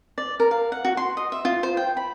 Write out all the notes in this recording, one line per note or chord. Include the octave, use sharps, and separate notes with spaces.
D5
A#4
F5
F#5
F#4
C6
D#5
E5
F4
C5
G5
B5